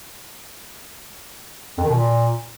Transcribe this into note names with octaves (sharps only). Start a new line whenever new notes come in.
F2
D#3
B2
A#2